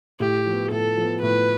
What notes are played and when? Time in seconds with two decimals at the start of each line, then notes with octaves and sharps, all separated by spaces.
0.20 A2 G4
0.46 F3 B3
0.71 A2 A4
0.97 F3 B3
1.23 A2 B4